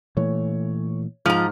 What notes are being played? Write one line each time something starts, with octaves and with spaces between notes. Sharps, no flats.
A#2 E3 A3 C#5
G#2 F3 A#5 F6